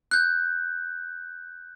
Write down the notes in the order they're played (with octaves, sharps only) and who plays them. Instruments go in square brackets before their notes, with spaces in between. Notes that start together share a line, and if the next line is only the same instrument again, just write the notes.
[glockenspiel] F#6 G6